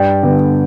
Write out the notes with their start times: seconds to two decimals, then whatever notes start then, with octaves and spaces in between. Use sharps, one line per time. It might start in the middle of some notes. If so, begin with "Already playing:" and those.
Already playing: G2 D5 G5
0.23 D3 B3